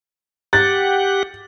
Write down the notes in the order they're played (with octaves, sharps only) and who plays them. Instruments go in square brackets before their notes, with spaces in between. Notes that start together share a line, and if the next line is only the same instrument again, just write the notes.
[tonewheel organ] G4 F#5 [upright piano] A6